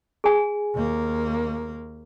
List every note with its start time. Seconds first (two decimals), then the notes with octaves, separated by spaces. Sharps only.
0.24 G#4 G#5
0.74 D#2 A#3